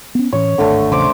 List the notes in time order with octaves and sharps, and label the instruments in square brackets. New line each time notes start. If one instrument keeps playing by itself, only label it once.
[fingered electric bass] B3 C#4
[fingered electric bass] A2 E3 C#4 [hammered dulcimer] C#5
[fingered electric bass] D1 G#1 [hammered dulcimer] D3 A3
[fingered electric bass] A#1 E2 C#3 [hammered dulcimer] C5 D6